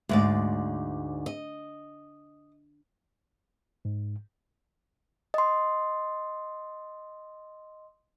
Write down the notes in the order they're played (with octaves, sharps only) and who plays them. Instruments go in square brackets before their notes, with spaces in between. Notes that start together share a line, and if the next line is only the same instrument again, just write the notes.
[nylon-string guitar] D2 G#2 D5
D#5
[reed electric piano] G#2
[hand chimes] D#5 C6